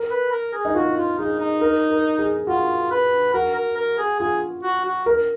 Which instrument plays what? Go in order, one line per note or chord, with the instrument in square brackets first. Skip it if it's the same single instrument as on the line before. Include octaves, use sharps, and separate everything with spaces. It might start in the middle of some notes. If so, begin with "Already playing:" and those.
Already playing: [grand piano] A#4
[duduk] B4
A#4
G#4
[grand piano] D#4
[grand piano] F4 [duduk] F#4
[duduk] F4
[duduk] D#4 [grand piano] G#4
[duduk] D#4
[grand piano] A#4
A#4
G#4
[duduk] F4 [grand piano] F#4
[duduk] B4
[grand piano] F#4 [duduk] A#4
[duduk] A#4
A#4
G#4
[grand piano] F4 [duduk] G#4
[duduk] F#4
F#4
[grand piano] A#4